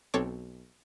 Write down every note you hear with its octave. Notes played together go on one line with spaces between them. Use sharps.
B1 C4 A4 C#5 D6